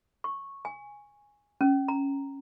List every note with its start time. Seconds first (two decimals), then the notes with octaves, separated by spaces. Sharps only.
0.24 C#6
0.65 G#5
1.61 C#4
1.88 A#5